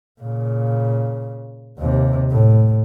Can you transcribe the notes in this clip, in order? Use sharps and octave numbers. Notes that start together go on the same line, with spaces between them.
A#2 C#3
D#2 C3
A2